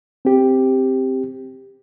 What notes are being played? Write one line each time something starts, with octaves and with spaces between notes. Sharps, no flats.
C4 G4